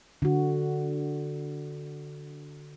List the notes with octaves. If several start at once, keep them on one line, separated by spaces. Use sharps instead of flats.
D3 F#4